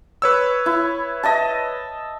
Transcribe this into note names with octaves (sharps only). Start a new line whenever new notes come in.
B4 C#5 E6
E4
D#5 E5 A5